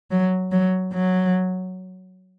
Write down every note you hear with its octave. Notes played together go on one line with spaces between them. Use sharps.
F#3
F#3
F#3